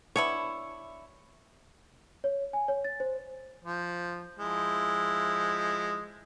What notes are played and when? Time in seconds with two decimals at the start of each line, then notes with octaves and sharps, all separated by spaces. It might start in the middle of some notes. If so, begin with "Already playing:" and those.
0.16 B3 D4 E4 C#5
2.24 C#5
2.53 G#5
2.68 C#5
2.84 A6
3.00 C5
3.65 F3
4.39 F3 G#3 E4